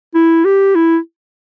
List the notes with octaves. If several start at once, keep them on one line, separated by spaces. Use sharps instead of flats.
E4
G4
E4